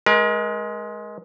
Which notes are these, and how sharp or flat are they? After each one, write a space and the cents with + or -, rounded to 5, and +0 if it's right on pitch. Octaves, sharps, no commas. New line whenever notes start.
G#3 +15 A#4 +40